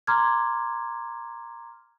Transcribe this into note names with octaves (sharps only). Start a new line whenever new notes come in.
A#5 C6 D6 F6 G#6